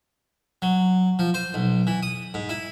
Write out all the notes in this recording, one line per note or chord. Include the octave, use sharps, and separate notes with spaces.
F#3
F3
C5
B1
E3
D#6
G#2
E4